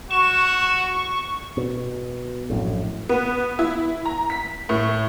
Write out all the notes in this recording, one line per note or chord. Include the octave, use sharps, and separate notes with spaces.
F#4 C#6 E7
B2
A#1 F#2 A2
B3
E4
A#5
B6
A2